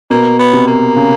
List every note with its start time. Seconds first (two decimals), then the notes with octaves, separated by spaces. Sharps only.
0.10 B2 A#3
0.39 B3
0.53 C3
0.68 A#3
0.96 C#3